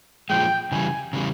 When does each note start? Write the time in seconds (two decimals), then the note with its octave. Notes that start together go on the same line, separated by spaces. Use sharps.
0.30 A#2 F3 G#3 G5
0.72 C#3 E3 G3 G#5
1.13 C#3 E3 G3